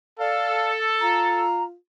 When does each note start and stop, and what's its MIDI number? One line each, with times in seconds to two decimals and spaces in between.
0.20 1.45 69
0.20 0.71 74
0.20 0.73 77
1.00 1.75 65
1.00 1.63 82